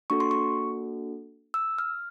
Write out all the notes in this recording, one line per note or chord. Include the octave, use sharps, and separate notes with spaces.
A#3 D4 F#4 A4 C#6
C6
C#6
E6
F6